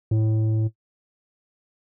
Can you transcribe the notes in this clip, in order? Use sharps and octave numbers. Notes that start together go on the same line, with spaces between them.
A2